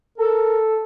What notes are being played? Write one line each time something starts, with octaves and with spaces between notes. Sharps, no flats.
A4 A#4